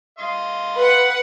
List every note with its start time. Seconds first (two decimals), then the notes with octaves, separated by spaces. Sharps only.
0.19 D#5 F5 C6
0.77 B4 F#5